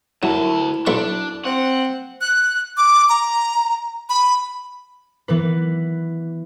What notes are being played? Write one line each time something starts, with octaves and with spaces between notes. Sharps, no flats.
D2 F#3 E4 A#4 A5
B1 D4 E5 C#6
C4 F#5
F#6
D6
A#5
B5
E3 B3 B4